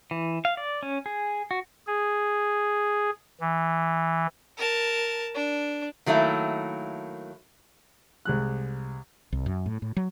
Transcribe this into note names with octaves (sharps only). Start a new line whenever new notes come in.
E3
F5
D5
C#4
G#4
F#4
G#4
E3
A#4 A5
D4
D#3 F#3 A3 A#3 E4
C2 G#3 F#6
C2
F#2
A2
A2
F#3